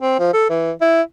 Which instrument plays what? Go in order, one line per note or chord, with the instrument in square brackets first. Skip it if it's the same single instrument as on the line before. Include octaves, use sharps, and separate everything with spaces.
[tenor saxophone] C4
F3
A4
E3
E4